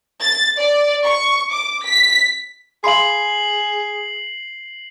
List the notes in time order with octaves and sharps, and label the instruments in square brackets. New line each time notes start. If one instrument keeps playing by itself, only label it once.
[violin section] A6
D5
C#6
D6
B6
[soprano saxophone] G#4 [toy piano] F5 B5 C6 [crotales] C7 F#7